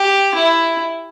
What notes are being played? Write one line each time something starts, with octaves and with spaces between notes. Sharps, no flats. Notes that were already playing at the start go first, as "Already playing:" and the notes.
Already playing: G4
E4